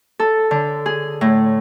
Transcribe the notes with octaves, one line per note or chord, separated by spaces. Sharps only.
A4
D3
G#4
A2